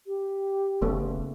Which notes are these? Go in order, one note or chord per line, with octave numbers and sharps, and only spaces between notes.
G4
F#1 C#3 A3 B3